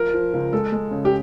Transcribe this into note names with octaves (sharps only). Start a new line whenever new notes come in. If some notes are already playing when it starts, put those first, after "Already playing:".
Already playing: F3 A#4
F3
C#2
G#3 A4
G#3
C#3
G4